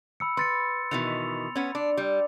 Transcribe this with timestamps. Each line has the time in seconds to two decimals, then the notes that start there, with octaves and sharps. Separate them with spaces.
0.20 B5 E6 C#7
0.37 B4 C6 A6 C#7
0.91 B2 D#3 E3 F7
1.56 B3 C#4
1.75 D4
1.97 G3